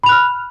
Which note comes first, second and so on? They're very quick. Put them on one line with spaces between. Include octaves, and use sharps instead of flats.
B5 F7 F#6 F6